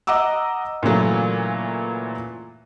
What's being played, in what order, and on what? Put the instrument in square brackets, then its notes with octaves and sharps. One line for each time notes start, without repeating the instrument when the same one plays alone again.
[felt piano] D#5 F#5 A#5 D6 E6
A#2 C#3 E3 F#3 A3